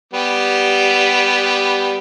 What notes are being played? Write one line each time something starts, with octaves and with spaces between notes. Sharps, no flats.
G3 B3 G4